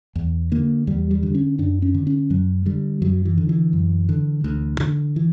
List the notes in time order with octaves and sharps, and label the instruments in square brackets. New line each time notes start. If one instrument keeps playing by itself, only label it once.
[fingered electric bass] E2
D3 A#3
E2 G3
G3
D3
C#4
F#2 D4
C#4
D3
C#4
F#2 F#3
D3 G3
F#2 F#3
E3
D3
E3
F#2
D3
D2
D3
E3